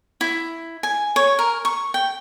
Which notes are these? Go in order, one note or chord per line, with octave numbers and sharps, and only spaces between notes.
E4
G#5
C#5
A#4
C#6
G5